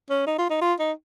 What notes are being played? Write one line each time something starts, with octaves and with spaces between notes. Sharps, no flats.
C#4
D#4
F4
D#4
F4
D#4